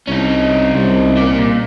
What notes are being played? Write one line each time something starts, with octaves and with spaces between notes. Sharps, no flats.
C2 C#4 D#4
C2
A#3 D5
A#2